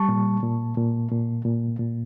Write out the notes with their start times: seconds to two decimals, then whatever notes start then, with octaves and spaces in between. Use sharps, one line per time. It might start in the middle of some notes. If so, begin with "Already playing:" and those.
Already playing: G3 A5 C#6
0.09 A#2
0.43 A#2
0.77 A#2
1.11 A#2
1.45 A#2
1.79 A#2